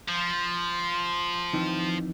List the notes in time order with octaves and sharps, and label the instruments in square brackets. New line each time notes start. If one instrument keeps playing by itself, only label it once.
[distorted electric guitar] F3 [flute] C6
[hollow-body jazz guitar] F2 D#3 E3